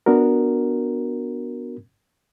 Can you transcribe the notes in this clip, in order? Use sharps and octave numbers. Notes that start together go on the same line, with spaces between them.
B3 D4 F#4 A#4